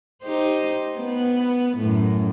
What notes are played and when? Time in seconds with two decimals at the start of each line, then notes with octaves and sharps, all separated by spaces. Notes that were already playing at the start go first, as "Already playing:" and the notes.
0.22 D#4 G4 C5
0.98 B3
1.78 F#2 A2